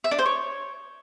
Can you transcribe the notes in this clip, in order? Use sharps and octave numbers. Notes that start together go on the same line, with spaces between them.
E5
D4
C5
C#5